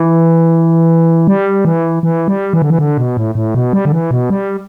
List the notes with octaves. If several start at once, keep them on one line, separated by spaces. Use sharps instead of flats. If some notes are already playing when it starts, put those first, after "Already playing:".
Already playing: E3
G3
E3
E3
G3
E3
D3
E3
D3
B2
A2
A2
B2
G3
D3
E3
B2
G3